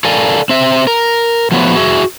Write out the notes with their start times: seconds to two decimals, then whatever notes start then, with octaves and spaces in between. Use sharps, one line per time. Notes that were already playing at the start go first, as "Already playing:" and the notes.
0.05 A4 A#4 D5 F5 G#5
0.49 C4 E5
0.87 A#4
1.52 F3 F#3 A3 B3
1.75 F#4 G#4 E5